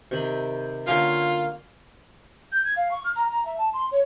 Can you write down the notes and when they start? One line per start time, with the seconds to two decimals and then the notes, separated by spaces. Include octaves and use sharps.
0.11 C3 D#3 B5
0.87 D3 A#3 C#4 F4
2.52 G6
2.64 G#6
2.76 F5
2.91 C#6
3.04 F6
3.16 A#5
3.31 A#5
3.45 E5
3.58 A5
3.73 C6
3.91 C#5